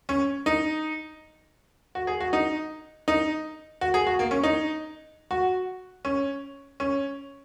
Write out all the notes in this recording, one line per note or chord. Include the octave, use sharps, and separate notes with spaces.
C#4
D#4
F#4
G#4
F#4
D#4
D#4
F#4
G#4
F#4
A#3
C#4
D#4
F#4
C#4
C#4